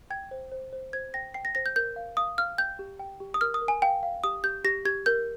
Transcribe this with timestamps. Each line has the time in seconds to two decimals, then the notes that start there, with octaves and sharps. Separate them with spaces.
0.10 G5 G#6
0.31 C5
0.52 C5
0.73 C5
0.93 C5 G#6
1.14 G5 A#6
1.34 G5 C7
1.45 A#6
1.55 C5 A#6
1.66 G6
1.76 A#4 G6
1.96 F5
2.17 F5 D#6
2.38 F5 F6
2.58 G5 G6
2.79 G4
2.99 G5
3.20 G4
3.34 D#6
3.41 A#4 F6
3.54 D#6
3.61 A#4
3.68 G#5
3.82 F5 G5
4.03 F5
4.24 G4 D#6
4.44 G4 G6
4.65 G4 A#6
4.85 G4 G#6
5.06 A#4 G6